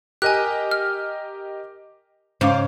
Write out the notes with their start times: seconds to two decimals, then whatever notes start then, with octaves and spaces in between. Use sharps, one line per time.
0.22 G4 A#4 D#5 G#5 F#6
0.71 F6
2.41 G#2 C#3 C#4 C5 F5 D6